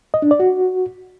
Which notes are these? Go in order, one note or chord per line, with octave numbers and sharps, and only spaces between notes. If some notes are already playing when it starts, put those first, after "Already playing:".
D#5
D4
D5
F#4